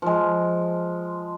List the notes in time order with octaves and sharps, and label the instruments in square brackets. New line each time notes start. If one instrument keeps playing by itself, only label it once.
[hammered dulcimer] F3 G#3